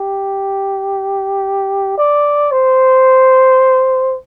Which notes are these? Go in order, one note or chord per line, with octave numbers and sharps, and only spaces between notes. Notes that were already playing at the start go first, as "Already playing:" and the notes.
Already playing: G4
D5
C5